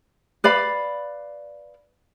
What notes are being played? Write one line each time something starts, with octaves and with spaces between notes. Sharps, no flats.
B4 D5 F5 B5